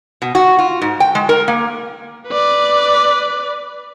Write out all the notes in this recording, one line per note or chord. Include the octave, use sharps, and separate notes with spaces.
B2
F#4
F4
G#2
G5
G#3
A#4
A#3
B4 D5